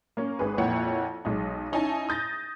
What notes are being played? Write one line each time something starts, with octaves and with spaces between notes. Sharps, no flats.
A#3 C#4
G#1 G#4 B4
F2 A#2 E4 C#5 F#5
B1 G#3 D#4
C#4 D#4 E4 G#5 A5
D#6 G6 A6 A#6